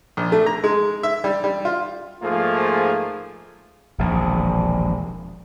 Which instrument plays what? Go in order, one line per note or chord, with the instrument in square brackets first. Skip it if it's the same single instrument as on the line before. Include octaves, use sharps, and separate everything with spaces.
[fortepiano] A#1
A3
A#5
G#3
E5
G3
G3
F4
[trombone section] G#2 F3 A3 A#3 F4 G#4
[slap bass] E1 A#1 D#2